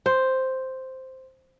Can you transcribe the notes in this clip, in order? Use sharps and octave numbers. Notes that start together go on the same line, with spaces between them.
C5